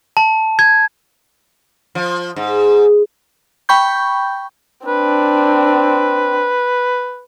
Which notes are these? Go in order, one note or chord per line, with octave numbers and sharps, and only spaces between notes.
A5
G#6
F3
G#2
G5 B5 C#6 G6
C4 D4 B4